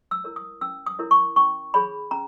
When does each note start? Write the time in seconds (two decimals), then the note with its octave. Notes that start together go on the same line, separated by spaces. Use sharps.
0.11 E6
0.24 E4 A#4 C#5
0.36 D#6
0.61 C#4 E6
0.86 D#6
0.99 E4 A#4 C#5
1.11 C#6
1.36 C#4 C#6
1.74 G#4 C#5 B5
2.11 C#4 A#5